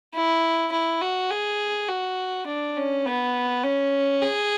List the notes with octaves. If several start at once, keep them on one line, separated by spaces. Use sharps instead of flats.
E4
E4
F#4
G#4
F#4
D4
C#4
B3
C#4
G#4